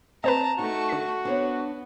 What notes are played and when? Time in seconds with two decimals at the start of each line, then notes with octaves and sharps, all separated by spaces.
0.24 C4 B4 C5 D#5 A5 A#5
0.59 A3 D#4 F#4 C#6
0.89 D3 B6
1.25 B3 D4 C5 C#5